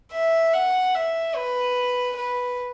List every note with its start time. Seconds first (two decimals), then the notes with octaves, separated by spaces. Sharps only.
0.12 E5
0.53 F#5
0.94 E5
1.35 B4
2.16 B4